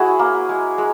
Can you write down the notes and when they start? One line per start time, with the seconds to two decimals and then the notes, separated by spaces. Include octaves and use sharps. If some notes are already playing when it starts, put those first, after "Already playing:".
Already playing: G#3 E4 F#4 G#4 C#5
0.19 A#3
0.49 G#3
0.78 G#3